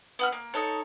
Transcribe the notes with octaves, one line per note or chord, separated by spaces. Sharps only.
B3 F#5 F6
A#3
D#4 A4 C#5